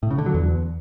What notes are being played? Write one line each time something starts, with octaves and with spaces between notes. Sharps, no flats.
A2
C#3
D3
F#3
E2